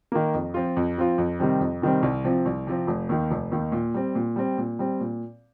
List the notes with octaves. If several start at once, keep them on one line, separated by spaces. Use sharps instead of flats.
D#3 A#3
F2
F3 C4 F4
F2
F3 C4 F4
F2
C3 D#3 G3 C4
F2
C3 D#3 G3 C4
C2
C3 F3 C4
C2
C3 F3 C4
F1
D#2 D#3
F1
D#2 D#3
A#2
G3 C4
A#2
G3 C4
A#2
G3 C4
A#2